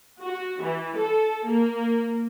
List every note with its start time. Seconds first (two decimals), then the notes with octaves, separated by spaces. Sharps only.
0.21 F#4
0.62 E3
0.97 A4
1.46 A#3